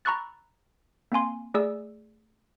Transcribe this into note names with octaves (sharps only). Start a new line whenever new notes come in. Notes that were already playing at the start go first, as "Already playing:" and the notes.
A#5 B5 C#6 E6 F#6 A6
A#3 C4 F5 G#5 C6
A3 G#4 D5 E6